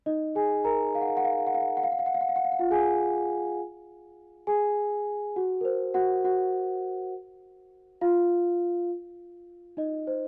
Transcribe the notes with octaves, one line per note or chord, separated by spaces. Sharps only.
D#4 D#5
G#4 G#5
A#4 A#5
F5
F#5
F5
F#5
F5
F#5
F5
F#5
F5
F#5
F5
F#5
F5
F#5
F5
F#5
F5
F#5
F5
F#5
F5
F#5
F4 F5
G#4 G#5
G#4 G#5
F#4 F#5
A#4
C5
F#4 F#5
F#4 F#5
F4 F5
D#4 D#5
C5